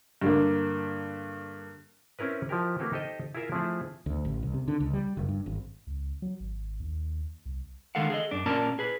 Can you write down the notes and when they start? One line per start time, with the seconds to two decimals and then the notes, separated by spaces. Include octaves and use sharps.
0.21 G2 D3 A#3
2.19 C4 C#4 E4 A#4 B4
2.49 F3 E4 G4 A#4
2.79 A3 A#3 C4 F#4 G4 B4
2.93 D#4 G4 A4 C5 D#5
3.35 E4 F4 G#4 A#4 E5
3.52 F3 A3 C4 E4 G#4
4.06 D2
4.25 A1
4.43 C2
4.54 C3
4.68 D3
4.80 C#2
4.93 G3
5.17 F#1
5.29 G2
5.46 G#1
5.87 C#2
6.22 F#3
6.40 G#1
6.80 D#2
7.46 C2
7.95 D3 D#3 G#3 A4 F5 F#5
8.10 G#4 A4 D#5
8.31 F#2 D4
8.46 A#2 A#3 C#4 A#4 D5 A5
8.79 G#4 B4